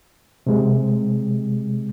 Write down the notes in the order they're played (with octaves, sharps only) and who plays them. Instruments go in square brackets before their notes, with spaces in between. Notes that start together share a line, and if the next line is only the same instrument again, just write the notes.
[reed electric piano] C3 G#3